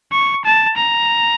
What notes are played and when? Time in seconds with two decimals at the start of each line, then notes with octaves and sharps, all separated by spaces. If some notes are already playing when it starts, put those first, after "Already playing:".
0.12 C#6
0.45 A5
0.76 A#5